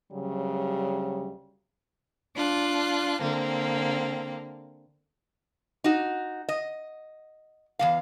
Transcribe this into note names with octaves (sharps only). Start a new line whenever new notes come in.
D2 C#3 F#3 G3
D4 F4 F#6
D3 A#3 C4
D#4 F#4
D#5
E2 F3 F5